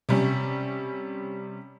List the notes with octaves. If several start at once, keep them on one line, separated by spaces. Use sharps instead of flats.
C3 G3 C#4